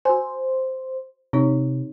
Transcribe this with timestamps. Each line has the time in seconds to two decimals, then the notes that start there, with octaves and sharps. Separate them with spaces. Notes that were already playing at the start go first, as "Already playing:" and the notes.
0.05 F#4 C5 G#5
1.33 C3 C4 D#4 C#5